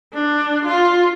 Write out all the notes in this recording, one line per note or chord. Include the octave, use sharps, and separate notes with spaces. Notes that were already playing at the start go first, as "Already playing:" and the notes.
D4
F4